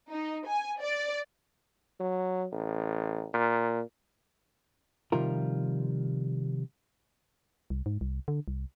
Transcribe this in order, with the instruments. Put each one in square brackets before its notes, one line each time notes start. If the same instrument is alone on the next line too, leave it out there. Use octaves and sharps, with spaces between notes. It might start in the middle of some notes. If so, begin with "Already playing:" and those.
[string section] D#4
G#5
D5
[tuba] F#3
A1
A#2
[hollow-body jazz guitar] C3 D#3 F3 G3 F4 A#4
[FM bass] C2
G#2
C2
D3
C2